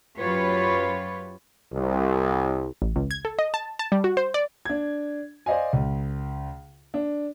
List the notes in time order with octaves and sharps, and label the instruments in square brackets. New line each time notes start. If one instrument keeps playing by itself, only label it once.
[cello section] F#2 F#3 F4 G4 B4 C#5
[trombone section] C2
[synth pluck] A1
C#2
G#6
A4
D#5
A5
A5
G3
F#4
C5
D5
[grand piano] D4 G#6
C5 D5 D#5 F5 G#5
C#2
D4